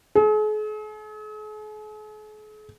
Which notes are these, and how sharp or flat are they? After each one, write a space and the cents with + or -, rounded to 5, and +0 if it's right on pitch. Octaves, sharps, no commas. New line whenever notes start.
G#4 +45